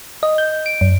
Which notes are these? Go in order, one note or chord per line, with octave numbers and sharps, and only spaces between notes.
D#5
G6
D7
F#2